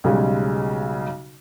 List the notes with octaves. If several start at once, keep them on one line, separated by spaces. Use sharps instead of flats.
B1 C#3 G3 G#3